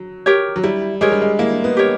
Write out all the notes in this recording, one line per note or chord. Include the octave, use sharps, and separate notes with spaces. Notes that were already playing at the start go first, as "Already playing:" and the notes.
Already playing: F#3
G4 A#4 C#5
F#3
G3 E4
G#3 G4 A#4 C#5
G3
G#3
A#3 E4
B3
G4 A#4 C#5